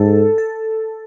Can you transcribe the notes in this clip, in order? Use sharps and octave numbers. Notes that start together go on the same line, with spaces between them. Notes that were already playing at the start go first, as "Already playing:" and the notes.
Already playing: G#2 A4
A4